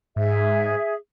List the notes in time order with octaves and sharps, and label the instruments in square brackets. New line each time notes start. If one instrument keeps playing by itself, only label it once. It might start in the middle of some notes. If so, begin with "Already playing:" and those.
[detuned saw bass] G#2 [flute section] G#4 E5